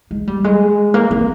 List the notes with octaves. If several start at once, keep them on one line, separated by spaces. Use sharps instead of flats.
G#3
G3
G#3
A#3
C4